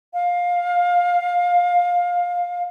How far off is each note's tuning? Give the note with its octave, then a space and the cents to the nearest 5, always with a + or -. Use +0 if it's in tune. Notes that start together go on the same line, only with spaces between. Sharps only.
F5 +20